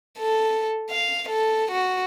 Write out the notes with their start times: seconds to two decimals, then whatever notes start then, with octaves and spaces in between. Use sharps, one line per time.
0.18 A4
0.90 F5
1.29 A4
1.71 F#4